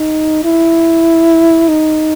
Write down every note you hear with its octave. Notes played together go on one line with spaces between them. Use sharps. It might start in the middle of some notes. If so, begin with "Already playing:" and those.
Already playing: D#4
E4
D#4